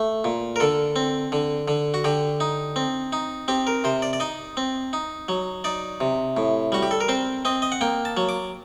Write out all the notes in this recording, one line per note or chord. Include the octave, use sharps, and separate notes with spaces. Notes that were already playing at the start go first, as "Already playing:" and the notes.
Already playing: A3
A#2
A#4
D3 A4
C4
D3
D3
F#4
D3 G4
D#4
C4
D#4
C4 G4
A#4
C3 C5
D5
D5
D#4 D#5
C4
D#4
F#3
D#4 D5
C3
A2
G3 F#4
G4
A4
A#4
C4 C5
C4 D#5
D#5
F#5
A#3 G5
A5
F#3
D6